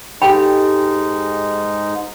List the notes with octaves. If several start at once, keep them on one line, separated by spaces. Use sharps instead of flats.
G#2 G#3 D#4 G4 A4 G5 B5